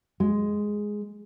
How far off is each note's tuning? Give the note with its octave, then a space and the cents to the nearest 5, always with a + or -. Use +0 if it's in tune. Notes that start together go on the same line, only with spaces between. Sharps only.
G#3 +0